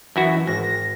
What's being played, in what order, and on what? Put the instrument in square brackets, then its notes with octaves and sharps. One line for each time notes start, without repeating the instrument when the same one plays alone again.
[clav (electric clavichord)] F#2 E4 F#4 [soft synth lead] E3
[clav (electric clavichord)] G#1 [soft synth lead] A#6